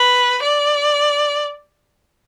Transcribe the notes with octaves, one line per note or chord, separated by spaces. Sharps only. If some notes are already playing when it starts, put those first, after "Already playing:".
Already playing: B4
D5